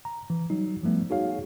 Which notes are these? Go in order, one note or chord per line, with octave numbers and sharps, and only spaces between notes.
A#5
E3
F#3 G3 D#4
F3 G3 A3 B3
D#4 F#4 G#4 C#5 F5